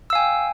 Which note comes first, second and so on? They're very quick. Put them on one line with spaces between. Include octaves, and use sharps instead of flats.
E6 F5 G#5 G5